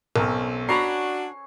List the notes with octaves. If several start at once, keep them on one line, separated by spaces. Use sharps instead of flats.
B1 C4 C#4 A4 A#4
D4 F#4 C#5 A#5 B5 C7